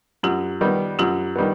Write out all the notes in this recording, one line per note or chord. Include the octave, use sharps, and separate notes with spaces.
F#2 F4 G4
D#3 G3 B3
F#2 F4 G4
D#3 G3 B3